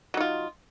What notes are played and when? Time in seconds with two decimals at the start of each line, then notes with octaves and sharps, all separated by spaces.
0.14 F#3
0.17 D#4
0.21 F4